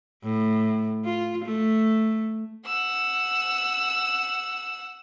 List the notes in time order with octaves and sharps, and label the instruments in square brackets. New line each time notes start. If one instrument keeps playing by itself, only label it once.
[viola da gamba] A2
F4
A3
[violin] F#5 E6